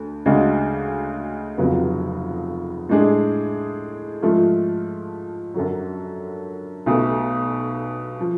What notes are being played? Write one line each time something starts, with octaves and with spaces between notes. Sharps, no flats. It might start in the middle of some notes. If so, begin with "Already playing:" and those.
Already playing: D2 D3
D2 C#3 G#3 D4 F#4
F1 F2 C#3 F#3 B3
A2 G#3 D4 G#4
G#2 F3 A3 F4
F#2 D3 F#3
B1 B2 A3
F3